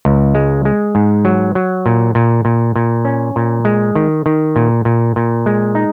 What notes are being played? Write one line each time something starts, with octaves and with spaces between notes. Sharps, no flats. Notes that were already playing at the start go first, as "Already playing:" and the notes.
C#2
G#3
G#3
G#2
F#3
F#3
A#2
A#2
A#2
A#2
C#4
A#2
G#3
D#3
D#3
A#2
A#2
A#2
G#3
D#4